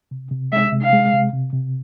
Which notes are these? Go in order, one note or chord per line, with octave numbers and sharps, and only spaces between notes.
C3
C3
G#3 E5
C3
F5
G#3
C3
C3
C3